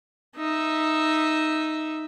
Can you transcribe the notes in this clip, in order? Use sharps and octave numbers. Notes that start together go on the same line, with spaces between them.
D#4 E5